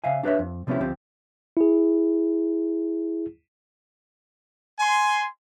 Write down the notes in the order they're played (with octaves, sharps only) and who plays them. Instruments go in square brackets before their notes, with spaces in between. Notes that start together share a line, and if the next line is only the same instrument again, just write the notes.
[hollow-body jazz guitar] C#3 E5 F5 G#5
D4 G4 B4 C#5 E5
F2
C3 F3 B3 C#4 E4 G4
D2 F3 C4 G4
[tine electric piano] E4 G#4
[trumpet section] G#5 C6